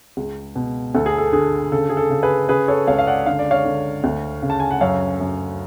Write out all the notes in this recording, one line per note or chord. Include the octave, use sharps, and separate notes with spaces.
C#2
B2
D2 A4
G#4
A4
D3 G#4
C#3 A4
G#4
A4
C#3
G#4 B4
C#3 G#4 B4
A4 C#5
C#2 C#5 F5
F5
D5 F#5
D3 F5
D5
C#5 F5
D3
D2
C#3
A5
G#5
F#5
F#2 C#5 F5
F#2